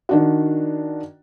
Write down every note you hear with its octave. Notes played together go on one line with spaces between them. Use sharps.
D#3 D4 F#4